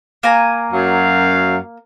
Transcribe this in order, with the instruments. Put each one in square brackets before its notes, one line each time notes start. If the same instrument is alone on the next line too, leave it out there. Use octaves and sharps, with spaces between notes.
[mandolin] A#3 G#5 A#5
[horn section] F#2 F#3 F5